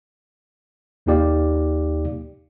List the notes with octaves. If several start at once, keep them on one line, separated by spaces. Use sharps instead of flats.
D#2 A#3 D#4 G4 D5 F5